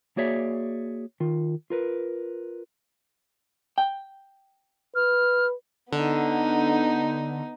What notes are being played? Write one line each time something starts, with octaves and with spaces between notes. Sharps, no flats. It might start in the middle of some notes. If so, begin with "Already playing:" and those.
A#3 F#4 G#4 C#5 D5 E5
D#3 F4
F4 A#4 B4
G5
B4 F6
D3 B3 D#4